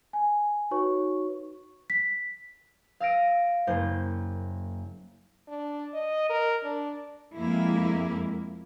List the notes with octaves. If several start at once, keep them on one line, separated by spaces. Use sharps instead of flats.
G#5
D#4 F#4 B4 C#5 C#6
B6
F5 E6 A#6 D7 D#7
F#1 A#3 C5 G6
D4
D#5
A#4
D4
F2 G#3 A#3 E4